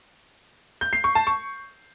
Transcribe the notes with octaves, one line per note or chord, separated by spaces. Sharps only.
G6
C7
C#6
A5
C#6